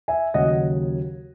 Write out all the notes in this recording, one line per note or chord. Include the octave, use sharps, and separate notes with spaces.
E5 G#5
D#2 C#3 F#3 D#5 F#5